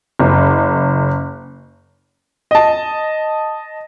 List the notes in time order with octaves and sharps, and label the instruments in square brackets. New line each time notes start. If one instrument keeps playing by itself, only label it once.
[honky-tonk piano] F#1
[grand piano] D#5 A5